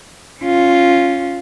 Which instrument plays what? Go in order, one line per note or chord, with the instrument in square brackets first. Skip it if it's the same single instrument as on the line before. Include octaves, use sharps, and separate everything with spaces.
[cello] C#4 F4